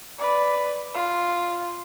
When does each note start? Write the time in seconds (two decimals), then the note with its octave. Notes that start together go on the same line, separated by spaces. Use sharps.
0.18 B4 D5
0.94 F4